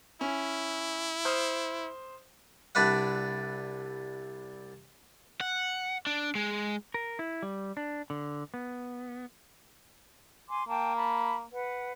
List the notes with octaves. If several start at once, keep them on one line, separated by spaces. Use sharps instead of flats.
C#4 E4
C5 D#6 F6
C2 D4 B4 D5 F#5
F#5
D4
G#3
A#4
E4
G3
D4
D3
B3
G#5 C6 D6
A#3 G5 A5
A5 B5
B4 F#5